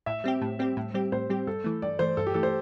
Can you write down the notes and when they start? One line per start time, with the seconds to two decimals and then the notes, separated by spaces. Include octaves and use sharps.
0.06 A2 E5
0.24 G3 C4 G4
0.42 A2
0.59 G3 C4 G4
0.77 A2
0.94 G3 C4 G4
1.12 A2 C5
1.30 G3 C4 G4
1.47 G2 A4
1.64 E3 A3
1.82 G2 D5
1.99 E3 A3 C5
2.17 G2 A4
2.27 G4
2.34 E3 A3 A4
2.43 C5